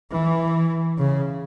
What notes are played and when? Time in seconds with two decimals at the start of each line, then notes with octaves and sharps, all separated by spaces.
0.11 E3
0.98 C#3